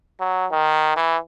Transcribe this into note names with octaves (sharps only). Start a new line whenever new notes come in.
F#3
D#3
E3